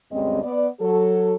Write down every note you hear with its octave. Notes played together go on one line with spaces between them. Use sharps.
D2 G2 G#3 C4 C#4 D#5
B3 D5
F#3 A4